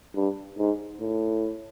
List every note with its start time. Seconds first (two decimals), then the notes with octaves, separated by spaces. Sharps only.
0.15 G2
0.58 G#2
1.00 A2